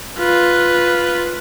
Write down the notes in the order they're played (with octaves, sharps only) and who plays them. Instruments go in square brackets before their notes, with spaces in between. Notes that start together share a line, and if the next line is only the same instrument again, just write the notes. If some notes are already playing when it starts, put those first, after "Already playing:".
[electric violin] F4 B4